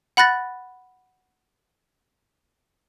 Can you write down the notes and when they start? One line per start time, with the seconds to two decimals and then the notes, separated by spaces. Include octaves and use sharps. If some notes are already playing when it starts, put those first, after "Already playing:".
0.17 F#5 B5 F#6 A6 A#6